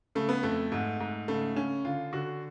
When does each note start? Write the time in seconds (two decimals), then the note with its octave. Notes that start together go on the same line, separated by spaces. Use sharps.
0.15 C#3 A3
0.29 B3
0.43 F2 A3
0.72 G#2
1.00 G#2
1.28 C#3 A3
1.56 C#3 C#4
1.85 D3 F4
2.13 D3 F#4